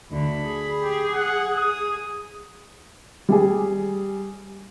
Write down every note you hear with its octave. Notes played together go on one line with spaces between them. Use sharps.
D2 D3 B5
G#4
G4
F#5
D#6
G3 G#4